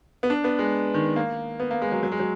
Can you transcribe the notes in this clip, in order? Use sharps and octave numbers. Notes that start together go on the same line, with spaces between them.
B3
D4
B3
G#3
D#3
A#3
B3
A#3
G#3
F#3
F#3
G#3
F#3